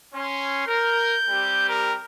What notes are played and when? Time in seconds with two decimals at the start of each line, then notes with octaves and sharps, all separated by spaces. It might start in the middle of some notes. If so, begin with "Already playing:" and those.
0.14 C#4 C6
0.67 A#4 G6
1.29 G3 C4 G4
1.69 A#4